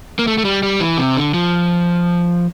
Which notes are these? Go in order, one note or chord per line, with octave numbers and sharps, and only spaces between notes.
A#3
A3
A3
G3
G3
E3
C3
D3
F3